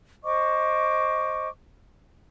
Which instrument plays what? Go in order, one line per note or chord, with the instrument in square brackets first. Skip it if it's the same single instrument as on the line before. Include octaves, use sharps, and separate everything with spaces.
[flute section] C5 D#5 C#6 D6